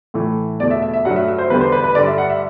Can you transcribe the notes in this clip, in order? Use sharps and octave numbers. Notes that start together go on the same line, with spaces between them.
A2 E3 A3
E2 B2 A3 D5
E5
E5
E5
G2 F#3 A3 F#5
E5
E5
C5
E2 D3 G3 B4
C5
B4
B4
G2 D3 G3 D5
E5
F#5
E5